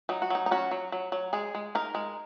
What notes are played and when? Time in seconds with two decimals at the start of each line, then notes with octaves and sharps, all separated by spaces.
0.09 F#3 D#4
0.22 F#4
0.30 F#3 D#4
0.46 D#4
0.51 C#4 F#4
0.71 F#3
0.92 F#3
1.12 F#3
1.33 G#3 G#4
1.55 G#3
1.75 D#4 A#4
1.95 G#3